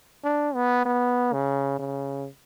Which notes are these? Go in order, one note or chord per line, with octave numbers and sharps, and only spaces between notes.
D4
B3
B3
C#3
C#3